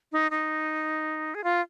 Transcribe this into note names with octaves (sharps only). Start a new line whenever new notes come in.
D#4
D#4
G#4
F4